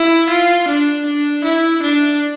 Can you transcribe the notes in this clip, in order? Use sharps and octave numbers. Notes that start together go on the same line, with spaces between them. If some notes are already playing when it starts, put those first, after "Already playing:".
Already playing: E4
F4
D4
D4
E4
D4